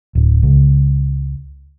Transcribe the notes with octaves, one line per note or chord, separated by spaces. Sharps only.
D1
C#2